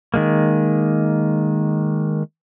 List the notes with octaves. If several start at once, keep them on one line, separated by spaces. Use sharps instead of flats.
D#3 G#3 A#3